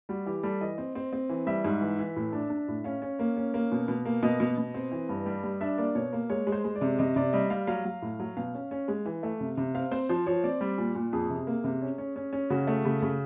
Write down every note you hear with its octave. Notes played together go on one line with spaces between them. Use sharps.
G3 F#4
E3 G4
G3 A4
E3 D#5
C4
C4
C4
E3
G3 E5
G#2
E3
E3
A2
D4
D4
A2
C#4 F5
C#4
A#3
C#4
A#3
B2
B2
A#3
B2 D#5
B2
B2
C4
E3
G2
G3
G3
D4 E5
A#3 D5
B2 C#5
A#3
G#3 C#5
G#3
C5
G#3
D5
C3
C3 D#5
C3 D5
G3 D#5
G3 F5
F#3 F5
F#3
A2
F#3
B2 F5
C#4
C#4
G#3
E3
A3
C3
C3
C4 F5
C4 C5
F3 C5
F3 C#5
C4 D5
G3
A#2
A#2
F2 G#4
C3
A#3
C3
C#4
C#4
C#4
C#4
C#3 F#4
A3
C#3
C#3